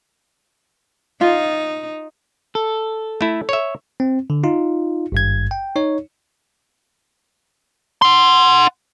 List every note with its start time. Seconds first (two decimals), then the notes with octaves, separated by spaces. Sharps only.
1.21 D#4 F4
2.55 A4
3.21 A3 E4
3.49 C#5 E5
4.00 C4
4.30 D3
4.44 D#4 F4
5.12 G#1 G2 G#6
5.51 G5
5.76 D#4 C#5
8.02 F#5 C6